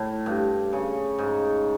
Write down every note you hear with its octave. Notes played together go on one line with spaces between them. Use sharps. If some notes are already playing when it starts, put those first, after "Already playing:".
Already playing: A2
G2
C#3
G#2